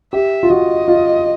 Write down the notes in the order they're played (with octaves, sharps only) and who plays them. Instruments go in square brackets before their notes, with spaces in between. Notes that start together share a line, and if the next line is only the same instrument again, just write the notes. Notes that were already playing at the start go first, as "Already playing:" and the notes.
[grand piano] G4 [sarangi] E5
[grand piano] F4
[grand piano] F#4 [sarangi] D#5
[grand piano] F4